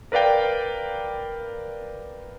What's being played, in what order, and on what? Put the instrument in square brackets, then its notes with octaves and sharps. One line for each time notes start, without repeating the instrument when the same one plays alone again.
[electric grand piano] A#4 B4 D5 F5 G5